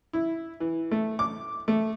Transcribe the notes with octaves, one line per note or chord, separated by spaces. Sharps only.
E4
E3
A3
D6
A3